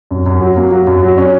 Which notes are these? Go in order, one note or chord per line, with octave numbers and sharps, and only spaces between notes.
F#2
F#2
F#3
A#3
F#3
F#2
F#3
C#4